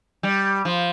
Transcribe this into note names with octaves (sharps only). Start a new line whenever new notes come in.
G3
F3